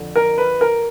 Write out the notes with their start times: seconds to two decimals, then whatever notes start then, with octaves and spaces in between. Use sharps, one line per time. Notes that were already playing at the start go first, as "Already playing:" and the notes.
Already playing: F2 D3
0.16 A#4
0.38 B4
0.61 A#4